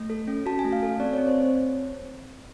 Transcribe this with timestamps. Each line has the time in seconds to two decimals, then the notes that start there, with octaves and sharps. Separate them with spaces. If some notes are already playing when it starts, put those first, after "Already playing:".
Already playing: A3
0.10 A4
0.27 C#4
0.46 F#4 A5
0.59 G#5
0.64 A3
0.73 F5
0.82 A4
1.00 C4 D5
1.13 C#5
1.18 C4
1.28 C5